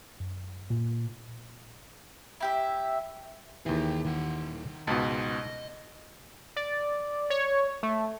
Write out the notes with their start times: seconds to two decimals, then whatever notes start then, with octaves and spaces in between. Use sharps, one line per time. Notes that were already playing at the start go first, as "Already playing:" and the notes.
0.20 F#2
0.70 A#2
2.41 E4 G4 E5
3.66 D#2 E3 G#4 G5
4.04 D#3 F#5
4.87 C#2 G#2 B2 D#5 A5
6.56 D5
7.30 C#5
7.83 A3